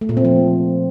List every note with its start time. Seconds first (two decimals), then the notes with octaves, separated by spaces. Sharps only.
0.01 A3
0.09 A#2
0.17 C4
0.25 F3